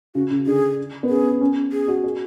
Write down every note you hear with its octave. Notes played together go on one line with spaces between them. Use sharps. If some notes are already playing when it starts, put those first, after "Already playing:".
C#3 F#4
C#3
D3 G#4
B3
C#4 G#4
C#4
G#4
F#4
G#4